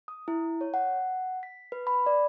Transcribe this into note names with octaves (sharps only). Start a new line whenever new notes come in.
D#6
E4
C#5
F#5
B6
B4
B5
D5